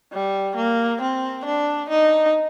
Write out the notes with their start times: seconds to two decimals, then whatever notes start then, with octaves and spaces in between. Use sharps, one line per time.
0.13 G3
0.57 A#3
1.01 C4
1.45 D4
1.89 D#4